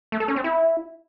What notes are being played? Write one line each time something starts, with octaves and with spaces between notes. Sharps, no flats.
A3
A4
C#4
C4
E4